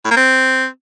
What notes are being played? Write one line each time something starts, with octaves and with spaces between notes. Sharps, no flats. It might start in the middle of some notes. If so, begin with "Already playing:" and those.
A2
A#3
C4